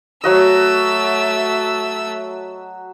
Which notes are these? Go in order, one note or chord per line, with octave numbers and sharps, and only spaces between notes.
F#3 A3 F#4 D#5 E6